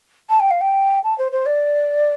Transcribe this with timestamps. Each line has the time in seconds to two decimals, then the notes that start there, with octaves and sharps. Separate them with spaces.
0.29 A5
0.40 G5
0.50 F5
0.61 G5
1.04 A5
1.18 C5
1.32 C5
1.46 D5